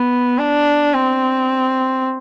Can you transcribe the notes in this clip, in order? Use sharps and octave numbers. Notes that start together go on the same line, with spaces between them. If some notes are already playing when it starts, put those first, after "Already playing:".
Already playing: B3
D4
C4